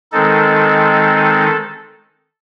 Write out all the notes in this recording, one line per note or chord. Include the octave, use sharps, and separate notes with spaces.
D#3 G#3 C4 D#4 A4